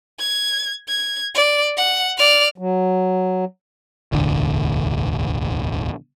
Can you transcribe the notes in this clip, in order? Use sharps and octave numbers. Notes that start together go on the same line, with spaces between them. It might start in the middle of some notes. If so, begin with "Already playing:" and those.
G#6
G#6
D5
F#5
D5 F6
F#3
E1 A1 D2 D3